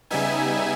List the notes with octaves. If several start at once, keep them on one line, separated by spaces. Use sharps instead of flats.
C#3 G3 B3 D#4 E5 G#5